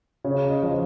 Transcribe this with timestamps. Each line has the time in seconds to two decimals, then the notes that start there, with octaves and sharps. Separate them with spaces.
0.24 C#3 C#5
0.49 D#5
0.63 F3